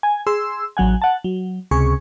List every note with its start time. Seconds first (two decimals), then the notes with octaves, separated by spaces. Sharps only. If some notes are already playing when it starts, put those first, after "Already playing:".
0.03 G#5
0.27 G#4 C6 E6
0.77 A1 F#3 F#5 G#5
1.02 F#5 A5
1.24 F#3
1.71 C#2 C3 G#4 C#6